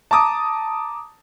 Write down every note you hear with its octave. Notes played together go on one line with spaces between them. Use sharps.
A5 A#5 D6 D#6